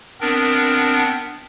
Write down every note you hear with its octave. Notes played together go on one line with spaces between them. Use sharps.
B3 C4 D4 A#4